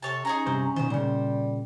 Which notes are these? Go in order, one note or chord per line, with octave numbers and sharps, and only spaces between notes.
C3 A4 C#5 A5
C#4 D#4 G#4 A#5
G2 C3 C5
B2 D#3 C5
A#2 C#3 G3